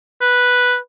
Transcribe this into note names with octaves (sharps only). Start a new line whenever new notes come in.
B4